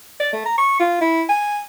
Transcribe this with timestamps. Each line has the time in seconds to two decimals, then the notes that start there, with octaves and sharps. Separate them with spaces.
0.20 D5
0.33 A3
0.45 A#5
0.58 C#6
0.79 F4
1.01 E4
1.29 G#5